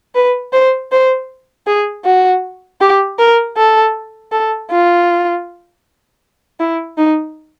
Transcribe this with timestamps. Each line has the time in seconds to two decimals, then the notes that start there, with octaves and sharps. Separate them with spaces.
0.15 B4
0.53 C5
0.92 C5
1.67 G#4
2.05 F#4
2.81 G4
3.19 A#4
3.57 A4
4.32 A4
4.71 F4
6.60 E4
6.97 D#4